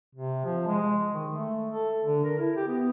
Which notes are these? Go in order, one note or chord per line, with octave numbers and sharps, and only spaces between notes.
C3
F3
G#3
D#3
A3
A4
D3
A#4
E4
G4
B3